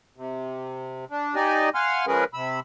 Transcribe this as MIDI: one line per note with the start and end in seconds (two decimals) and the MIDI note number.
0.16 1.05 48
1.11 1.35 62
1.35 1.69 63
1.35 1.69 67
1.35 1.69 74
1.35 1.69 75
1.35 1.69 80
1.75 2.05 77
1.75 2.05 78
1.75 2.05 80
1.75 2.05 84
1.75 2.05 89
2.07 2.24 53
2.07 2.24 56
2.07 2.24 61
2.07 2.24 68
2.07 2.24 70
2.07 2.24 71
2.34 2.60 48
2.34 2.60 83
2.34 2.60 88